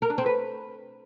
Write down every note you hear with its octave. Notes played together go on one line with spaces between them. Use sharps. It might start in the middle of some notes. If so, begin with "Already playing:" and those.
A#4
D4
C4
B4